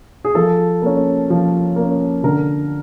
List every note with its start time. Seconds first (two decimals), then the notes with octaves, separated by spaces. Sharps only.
0.25 G#4
0.35 F3 A4
0.82 A#3 C#4
1.30 F3
1.76 A#3 C#4
2.23 D3 A#4